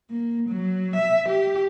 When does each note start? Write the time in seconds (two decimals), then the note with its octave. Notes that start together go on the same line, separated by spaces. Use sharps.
0.10 A#3
0.49 F#3
0.96 E5
1.29 G4